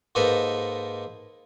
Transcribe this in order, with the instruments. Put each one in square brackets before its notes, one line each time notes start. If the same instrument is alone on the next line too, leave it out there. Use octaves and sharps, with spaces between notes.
[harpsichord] G#2 A#3 D#4 A4 B4